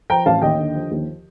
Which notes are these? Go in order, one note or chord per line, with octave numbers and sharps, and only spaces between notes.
F3 G5 A#5
A1 F5 A5
D#2 D#5 G5
D3
F3
D#2